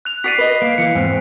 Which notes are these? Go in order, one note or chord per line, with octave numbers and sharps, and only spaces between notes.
F#6 F7
F#4 D5 B6 C7 D#7
B4 D#5
A#3
E3 A#3 C#7
E2 G#2 C4